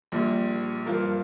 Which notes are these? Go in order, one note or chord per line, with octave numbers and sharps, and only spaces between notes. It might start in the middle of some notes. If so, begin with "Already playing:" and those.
A#1 A#2 G3
G2 F3 A#3 F4 A#4